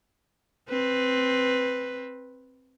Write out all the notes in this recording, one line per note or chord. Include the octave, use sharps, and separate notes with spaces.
C4 B4